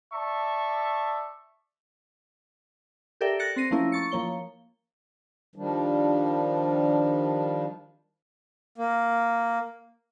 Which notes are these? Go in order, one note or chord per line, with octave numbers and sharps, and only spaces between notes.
D5 E5 A5 C#6
G4 A4 A#4 D5 E5 G5
F#6 A6 A#6 C#7
C4 A#6 C7 D#7
F3 A3 A#3 C#4 E4 A#4
C#6 A6 C#7
F3 A#3 C#5 G7
D#3 F3 G3 D4
A#3